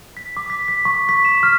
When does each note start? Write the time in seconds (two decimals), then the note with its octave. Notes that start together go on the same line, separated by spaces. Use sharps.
0.17 B6
0.37 D6
0.50 B6
0.68 B6
0.85 C#6
1.09 B6
1.25 E7
1.43 F6